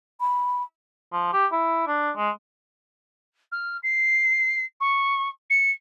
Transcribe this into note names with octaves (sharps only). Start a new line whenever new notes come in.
B5
F3
G4
E4
D4
G#3
F6
C7
C#6
C#7